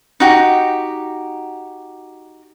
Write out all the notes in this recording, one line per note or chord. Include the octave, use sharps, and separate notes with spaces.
D#4 F#4 G4